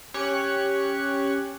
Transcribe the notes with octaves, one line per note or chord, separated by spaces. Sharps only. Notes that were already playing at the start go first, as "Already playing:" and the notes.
C#4 G4 C#5 C#6 F#6 C#7